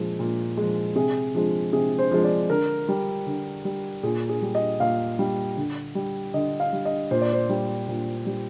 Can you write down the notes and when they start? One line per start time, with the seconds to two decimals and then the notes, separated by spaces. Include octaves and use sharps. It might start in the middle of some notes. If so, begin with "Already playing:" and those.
Already playing: A#2 F3 G#3
0.19 A#2
0.57 F3 G#3
0.95 C3 G#4
1.35 F3 G#3
1.72 C3 G#4
1.98 C5
2.11 F3 G#3
2.24 D5
2.50 D3 A#4
2.88 G3
3.26 D3
3.65 G3
4.03 A#2 G#4
4.29 G#4
4.42 G3
4.55 D#5
4.80 A#2 F5
5.19 G3
5.57 D3
5.95 G3
6.34 D3 D#5
6.60 F5
6.73 G3
6.85 D#5
7.11 A#2 C5
7.21 D5
7.33 C5
7.49 G3
7.88 A#2
8.26 G3